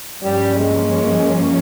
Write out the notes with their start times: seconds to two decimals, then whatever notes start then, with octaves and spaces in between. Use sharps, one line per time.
0.22 G2 F3 G3 A#3 C#4
0.56 G#3